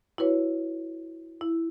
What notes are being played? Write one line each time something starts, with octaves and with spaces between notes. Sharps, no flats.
E4 F#4 B4 C#5
E4